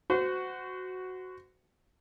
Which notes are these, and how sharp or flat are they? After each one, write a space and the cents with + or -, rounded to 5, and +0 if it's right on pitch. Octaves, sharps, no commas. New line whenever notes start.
F#4 +0 C5 -30